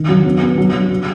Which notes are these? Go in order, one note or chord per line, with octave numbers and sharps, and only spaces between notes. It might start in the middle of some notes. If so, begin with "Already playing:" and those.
Already playing: D#3
F#3
B3
B3
F#3
F#3
F#3